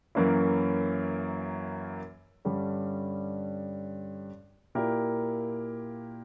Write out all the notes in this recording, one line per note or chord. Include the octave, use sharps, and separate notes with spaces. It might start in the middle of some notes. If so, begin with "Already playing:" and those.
F#2 E3 A#3 C#4 E4
G2 D3 G3 C#4
A#2 A#3 E4 G4 A#4